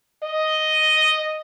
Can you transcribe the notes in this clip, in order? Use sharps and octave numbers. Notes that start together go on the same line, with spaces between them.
D#5